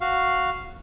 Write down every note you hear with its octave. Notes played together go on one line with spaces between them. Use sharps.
F#4 F5